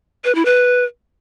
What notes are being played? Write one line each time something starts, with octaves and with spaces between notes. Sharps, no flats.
B4
E4
B4